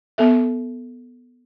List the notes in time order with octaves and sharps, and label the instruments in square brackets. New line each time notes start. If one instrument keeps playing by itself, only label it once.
[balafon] B3 A4 E5